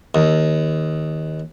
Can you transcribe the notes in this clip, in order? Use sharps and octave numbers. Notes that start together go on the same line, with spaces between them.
D#2